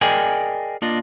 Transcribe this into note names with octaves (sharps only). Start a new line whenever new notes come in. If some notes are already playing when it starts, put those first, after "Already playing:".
G#4 A#4 D5 D#5 G5 G#5
A#3 D4 F4 D#5